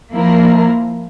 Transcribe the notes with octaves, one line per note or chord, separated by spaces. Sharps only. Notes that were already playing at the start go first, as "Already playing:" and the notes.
F3 A#3 E4 A#4